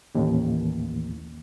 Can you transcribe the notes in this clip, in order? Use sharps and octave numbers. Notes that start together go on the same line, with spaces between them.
A1 D#2